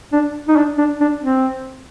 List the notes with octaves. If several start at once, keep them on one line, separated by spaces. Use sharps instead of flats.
D4
D#4
D4
D4
D4
C4